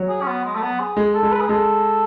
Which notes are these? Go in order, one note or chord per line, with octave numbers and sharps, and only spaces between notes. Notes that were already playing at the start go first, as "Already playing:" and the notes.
Already playing: F#3
G#4
C#4
B3
G#3
A3
B3
G#4
G#3
A4
G#3
B4
G#4
G#3 A4